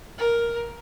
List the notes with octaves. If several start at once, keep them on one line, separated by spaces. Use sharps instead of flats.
A#4